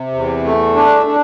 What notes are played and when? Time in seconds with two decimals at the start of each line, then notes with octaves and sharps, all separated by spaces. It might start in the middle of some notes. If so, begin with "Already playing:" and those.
Already playing: C3
0.14 E2
0.45 A3
0.76 D4
1.06 D4